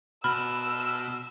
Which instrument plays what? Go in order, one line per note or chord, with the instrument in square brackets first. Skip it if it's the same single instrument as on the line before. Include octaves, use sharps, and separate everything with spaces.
[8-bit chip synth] B2 [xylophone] B5 [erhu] E6 [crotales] F6